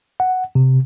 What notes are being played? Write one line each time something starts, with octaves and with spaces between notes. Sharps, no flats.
F#5
C3